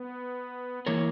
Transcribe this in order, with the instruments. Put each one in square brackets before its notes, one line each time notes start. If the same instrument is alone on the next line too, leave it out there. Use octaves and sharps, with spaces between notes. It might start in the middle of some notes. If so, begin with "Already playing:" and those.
Already playing: [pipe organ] B3
[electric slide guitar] E3 A#3 E4 A#4 C#5